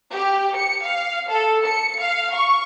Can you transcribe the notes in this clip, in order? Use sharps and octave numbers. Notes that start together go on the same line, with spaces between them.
G4
C#7
F5
A4
C#7
F5
C#6